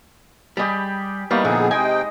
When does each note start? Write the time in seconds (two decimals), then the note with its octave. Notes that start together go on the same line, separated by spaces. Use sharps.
0.57 G3 G4 G#4 D#5 B5
1.31 G3 A#3 B3 D#4 E4 C#5
1.45 A#2 D3 F3 B3 G#4
1.71 C3 G#3 G#4 D#5 G5 G#5